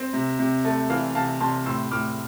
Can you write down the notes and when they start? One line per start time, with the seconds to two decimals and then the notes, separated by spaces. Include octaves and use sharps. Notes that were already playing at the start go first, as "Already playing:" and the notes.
Already playing: C4
0.13 C3
0.39 C3
0.65 A3
0.90 E3 F5
1.15 C3 F5 A5
1.41 C3 A5 C6
1.66 A2 C6 E6
1.91 A2 D6 F6